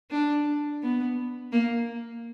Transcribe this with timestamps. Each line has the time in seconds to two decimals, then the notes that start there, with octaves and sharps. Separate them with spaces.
0.11 D4
0.82 B3
1.52 A#3